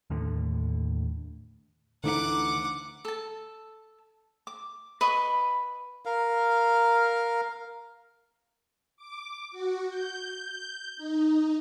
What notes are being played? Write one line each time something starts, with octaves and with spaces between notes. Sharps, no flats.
D#2 A2 D3
D2 D3 E3 D#4 F#5 D6
A4 A5
D6
B4 D#5 B5 C#6
A#4 F5
D6
F#4
G6
D#4